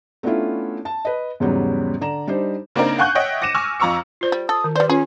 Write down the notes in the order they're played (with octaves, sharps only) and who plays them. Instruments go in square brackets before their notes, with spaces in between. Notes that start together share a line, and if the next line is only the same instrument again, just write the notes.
[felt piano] A3 B3 C#4 D4 E4 F4
A5
B4 D#5
E2 G#2 C#3 F#3 G3 B3
D3 D5 A#5 E7
G3 D4 D#4 C5
[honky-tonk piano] C#3 A#3 C4 D4 D#4 A#4
F5 F#5 G#5 C#6 F#6 G6
C#5 D#5 E5 F#5 G5
D6 A#6 C#7 D#7 E7
G#5 C#6 D6 E6 F6
F2 F4 A#5 C#6 E6 C#7
[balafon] F4 C5 D5
[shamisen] G3
[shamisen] A4 [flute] D#6
[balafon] D#3
[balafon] D#3 B4 [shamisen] G3 C5 [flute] D5
[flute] C#4 [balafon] F4 [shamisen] G#4 B4